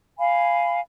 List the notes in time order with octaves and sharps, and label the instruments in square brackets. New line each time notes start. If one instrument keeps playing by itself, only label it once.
[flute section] F5 G#5 B5